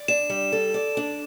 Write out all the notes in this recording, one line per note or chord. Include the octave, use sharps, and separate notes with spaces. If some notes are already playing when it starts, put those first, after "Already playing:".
Already playing: D5
D4 E7
G3
A4
D5
D4